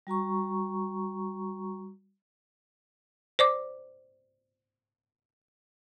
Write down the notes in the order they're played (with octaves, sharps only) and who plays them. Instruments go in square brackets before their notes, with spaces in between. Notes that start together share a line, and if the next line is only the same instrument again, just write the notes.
[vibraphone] G3 F#4 A#5 C#6
[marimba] C5 D5 D6